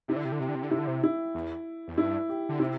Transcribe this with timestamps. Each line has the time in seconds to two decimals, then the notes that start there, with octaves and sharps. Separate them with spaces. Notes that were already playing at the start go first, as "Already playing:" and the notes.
0.08 C3 E4
0.16 D3
0.25 C3
0.32 D3
0.40 C3 G4
0.48 D3
0.55 C3
0.63 D3
0.71 C3 E4
0.79 D3
0.87 C3
1.04 E4
1.35 E2
1.88 E2
1.98 G2 E4
2.29 G4
2.49 D3
2.59 C3 E4